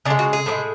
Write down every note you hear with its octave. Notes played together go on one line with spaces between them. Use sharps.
C#3 G#3 D4
F#4
G#4
A2 F3
G#3